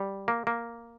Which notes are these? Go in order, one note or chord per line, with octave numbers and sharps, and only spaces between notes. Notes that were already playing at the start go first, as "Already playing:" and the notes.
Already playing: G3
A#3
A#3